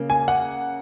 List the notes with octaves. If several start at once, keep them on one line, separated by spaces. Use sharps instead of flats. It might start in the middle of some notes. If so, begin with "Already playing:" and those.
Already playing: C#3 A#3
G#5
F#5